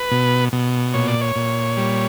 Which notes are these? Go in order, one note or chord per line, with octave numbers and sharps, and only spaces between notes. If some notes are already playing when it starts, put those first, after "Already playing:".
Already playing: B4
B2
B2
A#2 C#5
D5
C#5
A#2
G3